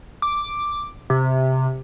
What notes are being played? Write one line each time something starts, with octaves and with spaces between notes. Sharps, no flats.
D6
C3